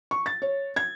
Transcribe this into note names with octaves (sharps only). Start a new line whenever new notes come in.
C#6
A6
C#5
G#6